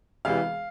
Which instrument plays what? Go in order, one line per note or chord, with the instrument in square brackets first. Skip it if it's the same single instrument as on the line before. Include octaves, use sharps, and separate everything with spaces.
[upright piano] E1 E2 C3 E3 F5